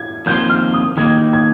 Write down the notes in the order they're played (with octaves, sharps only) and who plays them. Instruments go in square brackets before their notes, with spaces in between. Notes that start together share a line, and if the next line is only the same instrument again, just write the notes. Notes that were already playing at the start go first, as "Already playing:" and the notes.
Already playing: [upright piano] G#6
[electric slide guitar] F2 D#3 A#3 F4 C5 [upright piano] G6
[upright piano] F6
D#6
[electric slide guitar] D#3 A#3 D#4 [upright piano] G#6
[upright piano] G#6